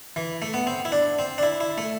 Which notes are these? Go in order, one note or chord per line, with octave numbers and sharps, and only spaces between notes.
E3
A3
B3
C4
E4
D4
C4
D4
E4
E4
A3